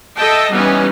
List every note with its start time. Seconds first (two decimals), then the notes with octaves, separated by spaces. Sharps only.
0.17 A4 D#5 E5 G5 A5
0.51 E3 G3 B3 C#4 D#4